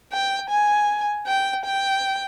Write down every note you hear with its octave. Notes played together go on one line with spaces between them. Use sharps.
G5
G#5
G5
G5